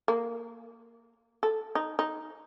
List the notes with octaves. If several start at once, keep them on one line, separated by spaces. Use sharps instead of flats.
A#3
A4
D#4
D#4